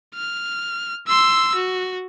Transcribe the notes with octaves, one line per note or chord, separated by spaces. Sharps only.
F6
C6 E6
F#4